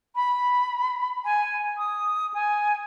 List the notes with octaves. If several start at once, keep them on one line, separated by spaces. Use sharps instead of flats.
B5
G#5
D#6
G#5